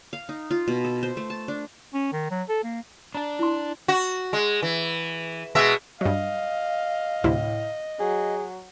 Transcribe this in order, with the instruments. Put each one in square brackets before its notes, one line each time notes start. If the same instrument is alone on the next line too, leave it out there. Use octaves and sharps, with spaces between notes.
[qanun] F5
D#4
F4
B2
A4
C5
A3
A5
D4
[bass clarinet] C#4
D#3
F#3
A4
A#3
[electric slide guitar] D4 D5 [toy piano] A#5
[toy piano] E4 C6
[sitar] F#4
G#3
E3
B2 G#3 E5
[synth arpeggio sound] G2 F#3 [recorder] D#5 [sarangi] F5
[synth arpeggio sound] D2 C3 E4 [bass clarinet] A2
[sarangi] F#3 [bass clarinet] G#4